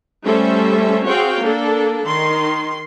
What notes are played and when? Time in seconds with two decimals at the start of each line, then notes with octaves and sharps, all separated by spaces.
0.25 G3 A3 C#4 A4 C5 E5
1.06 C4 F#4 G#4 C#5 F5 G5
1.41 A#3 D4 A4
2.06 D#3 C6